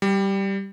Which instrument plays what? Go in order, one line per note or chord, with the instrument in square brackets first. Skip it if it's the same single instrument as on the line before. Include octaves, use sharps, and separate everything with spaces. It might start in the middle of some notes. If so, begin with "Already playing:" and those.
[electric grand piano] G3